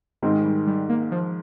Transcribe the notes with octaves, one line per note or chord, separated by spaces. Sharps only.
G#2 D#3 G#3 C4
G3
G3
A#3
F3